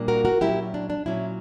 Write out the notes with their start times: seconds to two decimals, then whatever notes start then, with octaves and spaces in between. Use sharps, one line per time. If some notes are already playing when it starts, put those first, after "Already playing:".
Already playing: A#2 G3 A#3 D4
0.08 F#4 A#4
0.25 F#4 A#4
0.41 A#2 F#3 C#4 E4 G4
0.74 D4
0.90 D4
1.06 A#2 F#3 C#4 E4